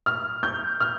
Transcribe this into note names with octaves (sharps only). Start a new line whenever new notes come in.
F6
G6
F6